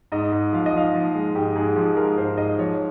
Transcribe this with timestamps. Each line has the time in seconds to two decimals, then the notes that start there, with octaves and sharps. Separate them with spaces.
0.12 G#2 D#5
0.32 G#2
0.53 F3 F5
0.66 D#5
0.74 F3 F5
0.94 F3
1.15 G#3
1.35 G#2 G4
1.56 G#2 G#4
1.76 F3
1.97 G#3 A#4
2.18 G#2 C5
2.37 G#2 D#5
2.59 F3 C#5